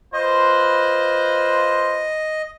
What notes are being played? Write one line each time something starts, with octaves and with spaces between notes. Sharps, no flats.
F4 B4 C5 D#5